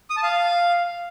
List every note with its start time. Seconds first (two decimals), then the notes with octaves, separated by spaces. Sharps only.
0.10 D#6
0.17 A5
0.23 F5